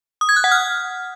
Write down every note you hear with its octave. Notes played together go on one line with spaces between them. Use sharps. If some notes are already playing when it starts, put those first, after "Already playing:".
D#6
G#6
F#6
F#5
F6